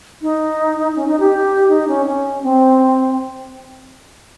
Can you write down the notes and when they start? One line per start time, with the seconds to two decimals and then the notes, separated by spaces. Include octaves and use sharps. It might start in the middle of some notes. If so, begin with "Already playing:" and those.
0.22 D#4
0.96 C#4
1.08 D#4
1.20 G4
1.69 D#4
1.88 C#4
2.06 C#4
2.43 C4